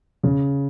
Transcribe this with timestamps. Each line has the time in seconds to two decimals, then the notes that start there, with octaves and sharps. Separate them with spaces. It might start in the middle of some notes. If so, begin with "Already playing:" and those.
0.23 C#3